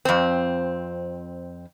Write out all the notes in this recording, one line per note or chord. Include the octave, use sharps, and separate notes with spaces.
F2 C4